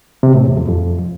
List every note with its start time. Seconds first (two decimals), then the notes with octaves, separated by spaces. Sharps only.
0.23 C3
0.34 A2
0.46 E2
0.57 F2
0.68 F2